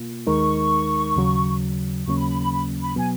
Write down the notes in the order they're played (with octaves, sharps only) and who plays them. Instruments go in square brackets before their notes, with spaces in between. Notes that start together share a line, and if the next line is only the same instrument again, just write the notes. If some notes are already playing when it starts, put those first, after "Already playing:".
Already playing: [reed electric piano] B2 A#3 F4
[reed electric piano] D#2 D#3 G#3 D#4 A#4 [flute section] C#6
[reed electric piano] D#2 C#3 F#3
[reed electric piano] D#2 C#3 F#3 A#3 C#4 [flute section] C#6
[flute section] B5
B5
B5
B5
B5
[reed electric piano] B2 F#3 B3 [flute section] G#5